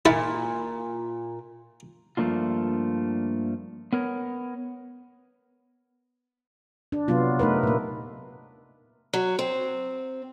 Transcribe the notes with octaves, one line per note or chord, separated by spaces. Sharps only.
A#2 E4
G2 F3 A3 A#3 D4 F4
B3 A#4 C#5
D4
C3 F#3 B3 F4
A3 D#4 A#4 B4
A#2 A#3
F#3
C4